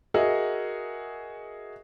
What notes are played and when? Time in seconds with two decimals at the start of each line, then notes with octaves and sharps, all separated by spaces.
0.14 F#4 G#4 A#4 D#5 E5 F#5